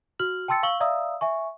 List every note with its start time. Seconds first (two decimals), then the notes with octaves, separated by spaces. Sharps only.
0.19 F#4 F6 F#7
0.48 G5 A5 C6 E6 A6 C#7
0.63 F5 C#6 E6 F#7 G7
0.80 D5 E5 F5 A#5 D#6 E6
1.21 E5 G#5 C#6